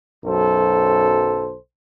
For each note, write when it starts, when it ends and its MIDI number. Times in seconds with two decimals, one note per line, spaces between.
0.25 1.56 35
0.25 1.56 42
0.25 1.56 69
0.25 1.56 72